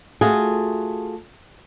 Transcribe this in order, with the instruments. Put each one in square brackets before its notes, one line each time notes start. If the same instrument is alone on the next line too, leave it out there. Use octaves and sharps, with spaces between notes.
[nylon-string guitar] A3 F4 F#4 G#4